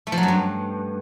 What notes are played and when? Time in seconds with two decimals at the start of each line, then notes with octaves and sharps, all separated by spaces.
0.07 A3
0.12 F3
0.18 F#3
0.23 F#2
0.28 G2